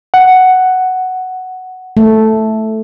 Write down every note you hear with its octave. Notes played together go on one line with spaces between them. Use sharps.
F#5
A3